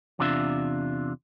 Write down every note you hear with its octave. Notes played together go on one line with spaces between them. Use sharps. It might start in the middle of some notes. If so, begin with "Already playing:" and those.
E2 C3 D4 F4 A#4 E5